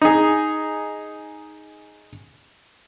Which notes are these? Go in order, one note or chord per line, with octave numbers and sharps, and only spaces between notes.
D#4 G#4